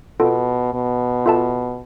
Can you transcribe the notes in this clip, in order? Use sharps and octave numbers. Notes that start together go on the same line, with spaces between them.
B2 B3 F4 A4
B2
F4 A4 E5 A5